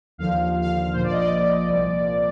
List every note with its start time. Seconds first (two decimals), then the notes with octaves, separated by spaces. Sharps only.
0.18 D#2 D3 F3 F5
0.39 F5
0.62 F5
0.93 A#1 A#2 F3 C5
1.03 D5
1.12 D#5
1.21 D5
1.68 C2 A#2 F3